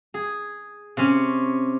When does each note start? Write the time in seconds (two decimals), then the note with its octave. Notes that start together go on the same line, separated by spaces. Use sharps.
0.14 G#4
0.97 C3 C#4